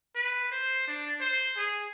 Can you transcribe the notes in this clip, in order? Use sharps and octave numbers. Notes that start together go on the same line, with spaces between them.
B4
C5
D4
C5
G#4